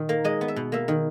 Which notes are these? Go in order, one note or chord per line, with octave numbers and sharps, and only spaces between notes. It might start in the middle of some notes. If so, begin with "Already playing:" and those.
Already playing: A#2 D#3
A#3
G#3 D#5
B3
E5
B2
A#3 E5
D#3